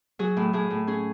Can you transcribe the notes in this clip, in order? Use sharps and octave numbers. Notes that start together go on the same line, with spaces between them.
F#3 G#4
A2
A2 G#4
A2
C#4 G#4